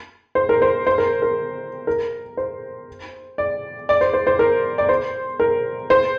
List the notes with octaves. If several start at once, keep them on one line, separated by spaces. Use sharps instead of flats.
C5
A#4
C5
C5
A#4
A#4
A#4
C5
D5
D5
C5
C5
C5
A#4
D5
C5
A#4
C5